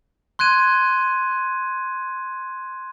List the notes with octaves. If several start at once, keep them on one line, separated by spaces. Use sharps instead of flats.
C6 F#6 G#6 D#7